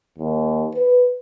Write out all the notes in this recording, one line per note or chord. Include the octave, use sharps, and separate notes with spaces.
D#2
B4